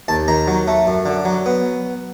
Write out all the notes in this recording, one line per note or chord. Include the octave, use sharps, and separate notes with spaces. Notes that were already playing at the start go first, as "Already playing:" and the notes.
D#2 A5
D#3 A#5
F#3
A3
F#2
D3
F#3
B3